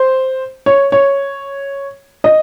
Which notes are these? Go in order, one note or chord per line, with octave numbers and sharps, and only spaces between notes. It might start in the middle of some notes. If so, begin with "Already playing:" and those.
Already playing: C5
C#5
C#5
D#5